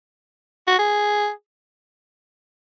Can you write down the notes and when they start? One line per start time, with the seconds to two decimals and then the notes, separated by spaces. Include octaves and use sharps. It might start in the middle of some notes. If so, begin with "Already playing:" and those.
0.67 F#4
0.79 G#4